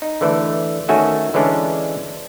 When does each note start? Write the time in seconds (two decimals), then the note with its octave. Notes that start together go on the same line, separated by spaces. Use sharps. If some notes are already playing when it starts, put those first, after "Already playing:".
0.02 D#4
0.21 D3 E3 A3
0.89 D#3 A3 C#4 F#4 E5 G#5
1.34 D3 E3 G#3 C#4 D4